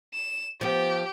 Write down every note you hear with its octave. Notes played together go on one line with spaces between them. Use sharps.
E7
F3 B3 G4